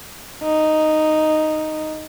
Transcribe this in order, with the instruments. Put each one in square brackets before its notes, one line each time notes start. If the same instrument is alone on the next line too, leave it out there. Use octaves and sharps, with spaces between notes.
[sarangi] D#4